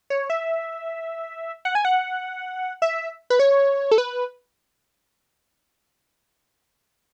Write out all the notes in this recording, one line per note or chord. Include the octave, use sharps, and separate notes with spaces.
C#5
E5
F#5
G#5
F#5
E5
B4
C#5
A4
B4